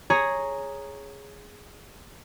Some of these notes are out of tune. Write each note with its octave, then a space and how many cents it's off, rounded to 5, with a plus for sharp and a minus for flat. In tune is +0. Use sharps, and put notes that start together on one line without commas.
G#4 +0 C#5 +0 A#5 +0